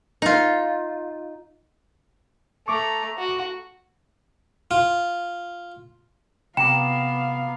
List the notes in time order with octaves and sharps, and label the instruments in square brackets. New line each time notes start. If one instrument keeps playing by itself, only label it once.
[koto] D#4 F4
[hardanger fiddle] A3 A#5 [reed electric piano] C#6 D6
[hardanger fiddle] F#4
[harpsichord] F4
[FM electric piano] C3 A#5 D6 [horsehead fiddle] B3 F5 [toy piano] G5 [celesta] E7